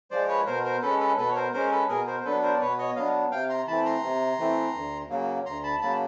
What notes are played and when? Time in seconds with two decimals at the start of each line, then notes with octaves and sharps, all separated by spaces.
0.11 F3 G#3 C5 D5
0.28 B4 C#5
0.46 B2 A#4 C5
0.64 A#4 C5
0.82 G#3 C#4 A4 B4
1.00 A4 B4
1.18 B2 A4 B4
1.29 C#5
1.35 A#4 C5
1.53 G#3 C#4 A#4 C5
1.66 A#4
1.71 A4 B4
1.89 B2 G#4 A#4
2.07 A#4 C5
2.20 C5
2.25 F#3 B3 D4 A4 B4
2.43 A#4 C5
2.54 D5
2.60 B2 B4 C#5
2.78 C#5 D#5
2.96 F#3 B3 D4 D#5 F5
3.31 C3 F5 G5
3.49 A#5 C6
3.67 E3 A3 C4 A5 B5
3.85 A#5 C6
4.03 C3
4.39 E3 A3 C4
4.74 D2
5.10 C#3 F#3 A#3
5.46 D2 A#5 C6
5.63 A5 B5
5.81 C#3 F#3 A#3 A5 B5